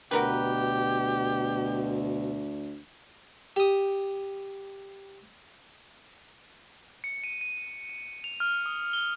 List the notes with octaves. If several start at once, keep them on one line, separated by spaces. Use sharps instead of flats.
D2 B2 F#4 G4 A#4 B4
G4 D#6
C#7
D#7
D#7
D#7
F7
F6
D#6
G7